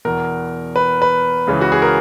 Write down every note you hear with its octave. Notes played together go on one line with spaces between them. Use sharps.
E2 B2 A#4
B4
B4
C#2 C#3 E3
F#4
G#4
A#4